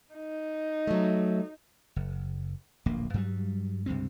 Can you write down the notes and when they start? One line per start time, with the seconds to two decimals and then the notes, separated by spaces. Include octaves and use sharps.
0.15 D#4
0.87 F#3 A3
1.96 F#1
2.86 D1 A#1 A#3
3.14 G2 F#3 G3
3.86 C#2 G2 C3 C4